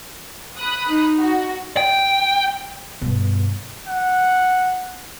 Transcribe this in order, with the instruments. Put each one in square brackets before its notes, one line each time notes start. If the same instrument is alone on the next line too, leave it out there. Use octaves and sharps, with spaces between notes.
[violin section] B5 D#6 F#6
[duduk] D#4
[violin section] F#4
[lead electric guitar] G5
[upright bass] G2 B2
[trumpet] F#5